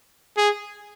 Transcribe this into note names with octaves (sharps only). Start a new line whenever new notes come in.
G#4